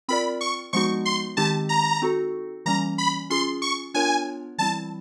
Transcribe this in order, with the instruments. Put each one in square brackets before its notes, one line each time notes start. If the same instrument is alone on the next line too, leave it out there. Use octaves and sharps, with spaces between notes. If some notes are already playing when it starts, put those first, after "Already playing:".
[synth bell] C4 F4 A#4 D5 [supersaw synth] B5
[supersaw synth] C#6
[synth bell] F3 G#3 B3 D#4 F#4 [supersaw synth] C#6
[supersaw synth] C6
[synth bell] D#3 G#3 C4 D#4 G4 [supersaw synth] A5
[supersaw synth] A#5
[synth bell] C4 D#4 F#4 A4
[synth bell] E3 G3 A#3 C#4 [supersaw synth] A#5
[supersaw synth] B5
[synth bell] C#4 F4 G#4 [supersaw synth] C6
[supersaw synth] C#6
[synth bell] B3 D4 F4 A#4 C#5 [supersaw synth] G#5
[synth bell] E3 G3 C4 E4 [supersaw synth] A5